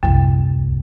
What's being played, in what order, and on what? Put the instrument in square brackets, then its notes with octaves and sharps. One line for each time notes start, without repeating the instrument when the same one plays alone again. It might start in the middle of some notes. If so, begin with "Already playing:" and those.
[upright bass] D1 C2 [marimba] F#2